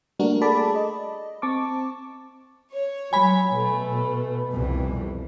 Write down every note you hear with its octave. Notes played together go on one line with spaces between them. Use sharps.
G3 A3 A#3 D4 F#4 A#4
G#4 A4 D5 A5 B5 D6
D#5
C4 A5 C#6 D6
C#5
F#3 G#5 B5
B2 A3
C2 F2 E3